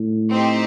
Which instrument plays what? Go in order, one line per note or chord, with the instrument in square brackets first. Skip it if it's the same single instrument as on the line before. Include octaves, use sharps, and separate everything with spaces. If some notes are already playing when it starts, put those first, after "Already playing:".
Already playing: [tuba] A2
[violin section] C4 D#4 G4 C5